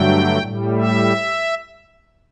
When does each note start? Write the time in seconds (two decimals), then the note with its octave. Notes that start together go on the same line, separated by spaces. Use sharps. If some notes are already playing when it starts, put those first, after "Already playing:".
Already playing: G2 D3 F#3 A3 G5
0.38 A2 G3
0.76 E5